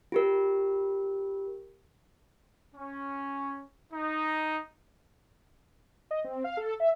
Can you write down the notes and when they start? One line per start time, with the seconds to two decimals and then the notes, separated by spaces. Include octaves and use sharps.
0.12 F4 G4 A#4
2.74 C#4
3.93 D#4
6.11 D#5
6.24 C4
6.44 F5
6.57 A4
6.80 E5